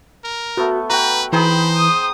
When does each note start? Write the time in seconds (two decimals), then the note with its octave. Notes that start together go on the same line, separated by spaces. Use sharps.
0.24 A#4
0.57 A3 B3 F#4
0.90 F#4 B4 F#5 G5 A#5
1.33 E3 D#4 G#4 C5 G5 B5
1.76 D#6